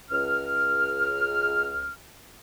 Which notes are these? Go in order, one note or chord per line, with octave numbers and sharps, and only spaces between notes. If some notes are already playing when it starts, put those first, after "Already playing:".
C#2 F6